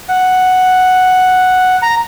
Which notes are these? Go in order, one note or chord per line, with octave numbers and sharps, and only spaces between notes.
F#5
A#5